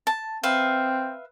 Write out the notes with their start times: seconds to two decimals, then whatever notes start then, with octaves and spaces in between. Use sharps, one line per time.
0.07 A5
0.43 C4 B4 E5 F5